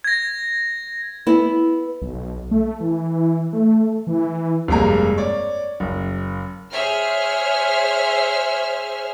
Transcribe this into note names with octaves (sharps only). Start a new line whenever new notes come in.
G#6 A#6
B3 E4
B1
A3
E3
A3
E3
E3
F1 G2 G#3 A#3 A#5
C#5 D5
F#1
G#4 C5 C#5 E5 F6